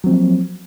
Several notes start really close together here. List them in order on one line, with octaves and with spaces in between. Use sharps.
F#3 C4 F3 A#3